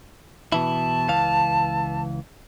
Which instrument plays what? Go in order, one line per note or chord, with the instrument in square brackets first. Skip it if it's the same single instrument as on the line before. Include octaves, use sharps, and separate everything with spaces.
[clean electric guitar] B2 E3 E4 [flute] A5
[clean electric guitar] C#2 E3 F5